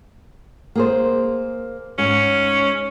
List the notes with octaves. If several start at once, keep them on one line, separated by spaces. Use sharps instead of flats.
A#3 G#4 C5
G#2 C#4